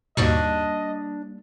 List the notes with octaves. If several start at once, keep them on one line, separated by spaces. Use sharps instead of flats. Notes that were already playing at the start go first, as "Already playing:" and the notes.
D#2 G#2 B2 G3 A#3 D4 D#5 C#6